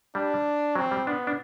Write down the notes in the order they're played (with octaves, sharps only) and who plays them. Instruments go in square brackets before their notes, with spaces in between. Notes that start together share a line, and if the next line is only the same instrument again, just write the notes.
[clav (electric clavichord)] G3 [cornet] D4
[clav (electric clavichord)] F#3 [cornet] C4
[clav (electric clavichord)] G3
[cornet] B3 [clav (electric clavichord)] D4
[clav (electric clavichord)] D4